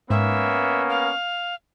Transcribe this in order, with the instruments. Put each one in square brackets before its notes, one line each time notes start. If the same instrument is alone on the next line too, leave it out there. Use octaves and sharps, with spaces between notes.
[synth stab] G#2 [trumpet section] A#3 B3 C#4 [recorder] E5
[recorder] F5